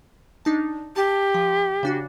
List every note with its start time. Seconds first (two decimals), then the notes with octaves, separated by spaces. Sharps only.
0.45 D4 D#4 A5
0.96 G4 A5
1.34 F3
1.83 C#3 D4 F#4